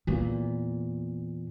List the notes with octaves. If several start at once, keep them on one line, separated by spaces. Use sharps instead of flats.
E2 A#2